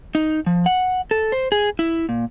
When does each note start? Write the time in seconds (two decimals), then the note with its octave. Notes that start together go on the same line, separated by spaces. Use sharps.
0.15 D#4
0.46 F3
0.66 F#5
1.11 A4
1.32 C5
1.52 G#4
1.79 E4
2.09 A#2